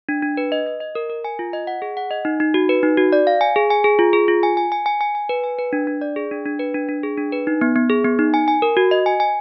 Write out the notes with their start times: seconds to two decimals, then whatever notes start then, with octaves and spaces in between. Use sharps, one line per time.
0.09 D4
0.22 D4
0.37 B4
0.52 D#5
0.66 D#5
0.80 D#5
0.95 A#4
1.10 A#4
1.24 G#5
1.39 F4
1.53 D#5
1.67 F#5
1.82 G#4
1.97 F#5
2.11 D#5
2.25 D#4
2.40 D#4
2.54 F#4
2.69 B4
2.83 D#4
2.97 F#4
3.13 D5
3.27 F5
3.41 G#5
3.56 G#4
3.70 G#5
3.84 G#4
3.99 F4
4.13 G#4
4.28 F4
4.43 G#5
4.57 G#5
4.72 G#5
4.86 G#5
5.01 G#5
5.15 G#5
5.29 B4
5.44 G#5
5.58 B4
5.73 D4
5.87 D4
6.01 D5
6.16 G#4
6.31 D4
6.46 D4
6.59 B4
6.74 D4
6.89 D4
7.03 G#4
7.18 D4
7.32 B4
7.47 D#4
7.61 B3
7.76 B3
7.90 G#4
8.05 B3
8.19 D#4
8.34 G#5
8.48 G#5
8.62 A#4
8.77 F#4
8.91 D#5
9.06 G#5
9.20 G#5